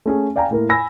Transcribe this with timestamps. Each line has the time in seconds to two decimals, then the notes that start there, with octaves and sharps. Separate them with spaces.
0.06 A3 C#4 G#4
0.36 D5 F5 G5 G#5 A#5
0.51 A2 A#3 A#4
0.69 G#5 B5 E6 A#6